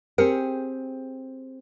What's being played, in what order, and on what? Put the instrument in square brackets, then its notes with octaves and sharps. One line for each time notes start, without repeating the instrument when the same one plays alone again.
[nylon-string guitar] C4 G4 G#4 [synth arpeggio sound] A#4 C#7